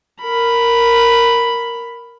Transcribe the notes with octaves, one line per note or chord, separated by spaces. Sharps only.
A#4 B5